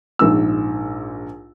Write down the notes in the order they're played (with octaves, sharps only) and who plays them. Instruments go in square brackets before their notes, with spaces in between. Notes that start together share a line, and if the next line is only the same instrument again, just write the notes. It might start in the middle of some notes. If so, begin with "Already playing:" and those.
[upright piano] A#1 G#2 E6